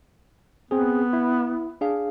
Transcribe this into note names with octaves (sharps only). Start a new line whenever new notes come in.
B3 C4 G#4
E4
D4 G#4 F5